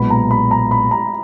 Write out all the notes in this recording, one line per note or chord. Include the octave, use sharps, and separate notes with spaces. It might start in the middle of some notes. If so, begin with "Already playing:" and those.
Already playing: B1 A#2 G#3 B3 B5
A#5
B5
A#5
B5
A#5